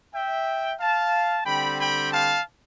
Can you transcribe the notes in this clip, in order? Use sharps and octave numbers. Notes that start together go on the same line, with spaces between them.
E5 G5
F5 A5
D3 G3 C4 G5 B5
G5 B5
F5 A5